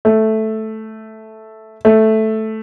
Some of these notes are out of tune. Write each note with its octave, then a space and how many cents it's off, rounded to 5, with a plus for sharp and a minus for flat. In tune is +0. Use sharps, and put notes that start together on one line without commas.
A3 -5
A3 -5